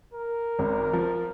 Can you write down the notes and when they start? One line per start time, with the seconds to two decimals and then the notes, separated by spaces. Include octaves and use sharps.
0.14 A#4
0.59 G#1
0.93 F3